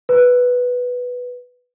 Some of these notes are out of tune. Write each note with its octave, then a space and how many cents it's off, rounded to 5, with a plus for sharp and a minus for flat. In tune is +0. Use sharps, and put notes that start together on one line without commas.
B4 +0